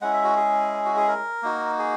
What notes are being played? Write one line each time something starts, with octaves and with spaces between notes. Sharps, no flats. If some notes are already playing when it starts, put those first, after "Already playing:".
G#3 C#4 E4 F#5
E5
F#4
G#4
F#4
G#4
A#4
A#3 D#4 F#4
G#4